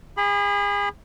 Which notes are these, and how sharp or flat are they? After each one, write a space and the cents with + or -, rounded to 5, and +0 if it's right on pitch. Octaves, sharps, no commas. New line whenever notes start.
G#4 -35 B5 +0